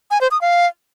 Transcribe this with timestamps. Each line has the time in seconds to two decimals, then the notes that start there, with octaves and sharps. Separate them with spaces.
0.11 G#5
0.21 C5
0.31 D#6
0.41 F5